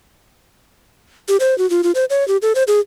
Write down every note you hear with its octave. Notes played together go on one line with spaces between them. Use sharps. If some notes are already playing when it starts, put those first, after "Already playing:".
G4
C5
F#4
F4
F4
C5
C#5
G4
A4
C5
G#4